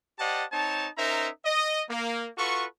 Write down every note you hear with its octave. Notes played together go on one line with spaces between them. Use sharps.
G4 C5 D5 D#5 F#5 A5
C4 D#4 C#5 A5
C#4 D#4 A#4 C5 E5 A#5
D#5
A#3
F4 F#4 A4 B4 C#6